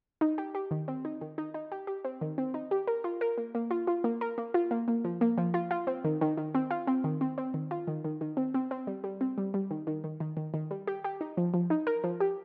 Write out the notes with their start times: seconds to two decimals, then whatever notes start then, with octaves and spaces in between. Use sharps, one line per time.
0.21 D#4
0.38 G4
0.55 G4
0.71 D#3
0.88 C4
1.05 D#4
1.21 D#3
1.38 D#4
1.54 D#4
1.72 G4
1.87 G4
2.04 C4
2.21 D#3
2.38 C4
2.54 D#4
2.71 G4
2.87 A#4
3.04 F4
3.21 A#4
3.38 A#3
3.55 A#3
3.71 F4
3.87 F4
4.04 A#3
4.21 A#4
4.38 A#3
4.54 F4
4.71 A#3
4.88 A#3
5.05 F3
5.21 A#3
5.38 F3
5.54 F4
5.71 F4
5.87 C4
6.04 D#3
6.21 D#3
6.37 D#3
6.55 C4
6.71 F4
6.87 C4
7.04 D#3
7.21 C4
7.38 C4
7.54 D#3
7.71 F4
7.87 D#3
8.04 D#3
8.21 D#3
8.37 C4
8.54 C4
8.71 C4
8.87 G3
9.04 G3
9.21 C4
9.38 G3
9.54 G3
9.71 D#3
9.87 D#3
10.04 D#3
10.20 D#3
10.37 D#3
10.54 D#3
10.71 G3
10.87 G4
11.04 G4
11.21 D#4
11.37 F3
11.54 F3
11.70 D#4
11.87 A#4
12.04 F3
12.20 G4